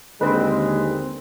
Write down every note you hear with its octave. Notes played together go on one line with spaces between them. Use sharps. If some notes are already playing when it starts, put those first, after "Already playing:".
D#2 D3 G#3 C4 B4